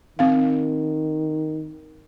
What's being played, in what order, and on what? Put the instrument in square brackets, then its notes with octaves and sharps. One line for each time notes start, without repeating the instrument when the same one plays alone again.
[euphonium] D#3 [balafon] C4 F5